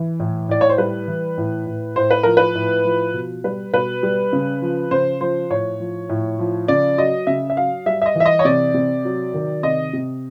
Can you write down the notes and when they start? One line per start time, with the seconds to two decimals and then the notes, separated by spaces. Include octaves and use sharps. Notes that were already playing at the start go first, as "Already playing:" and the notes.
Already playing: E3
0.20 A2
0.49 A2 D5
0.61 C#5
0.69 C5
0.78 G3 B4
1.07 E3
1.37 A2
1.66 A2
1.96 A2 C5
2.11 B4
2.23 F3 A#4
2.37 B4
2.55 A2
2.85 F3
3.14 B2
3.44 G3 B4
3.73 B2 B4
4.03 G3
4.33 C#3
4.62 F3
4.91 C#3 C5
5.21 F3 C5
5.50 A2 C#5
5.80 F3
6.09 A2
6.39 F3
6.68 C#3 D5
6.98 F#3 D#5
7.27 C#3 E5
7.50 E5
7.57 F#3 F5
7.86 G3 E5
8.02 E5
8.06 D#5
8.15 E3 E5
8.26 D#5
8.39 C#5
8.45 C3 D5
8.74 C3
9.05 F#3
9.34 D#3
9.63 C3 D#5
9.93 C3